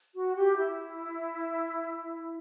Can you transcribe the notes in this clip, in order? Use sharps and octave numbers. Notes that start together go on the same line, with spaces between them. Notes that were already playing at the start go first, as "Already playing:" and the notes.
F#4
G4
E4